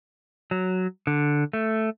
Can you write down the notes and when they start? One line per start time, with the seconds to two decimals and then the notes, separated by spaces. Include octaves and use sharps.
0.51 F#3
1.07 D3
1.53 A3